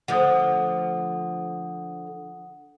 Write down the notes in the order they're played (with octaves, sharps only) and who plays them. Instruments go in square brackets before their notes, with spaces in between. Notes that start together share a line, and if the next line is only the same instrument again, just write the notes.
[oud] D3 F3 A3 [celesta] F#5 D#6